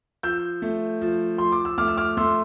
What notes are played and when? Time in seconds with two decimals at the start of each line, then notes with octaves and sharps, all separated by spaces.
0.23 F3 E6 G6
0.62 A3
1.02 F3
1.38 F3 C6
1.52 D6
1.65 E6
1.78 A3 D6 F6
1.88 E6
1.97 D6 F6
2.17 A3 C6 E6